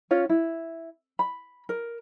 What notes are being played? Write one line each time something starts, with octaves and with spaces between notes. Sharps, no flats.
C#4 F4 C#5
E4
B5
A#4